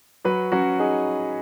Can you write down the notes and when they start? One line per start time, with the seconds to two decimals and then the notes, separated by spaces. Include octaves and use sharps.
0.25 F#3 F#4 B4
0.52 F#3 C#4 F#4
0.79 D#4 G#4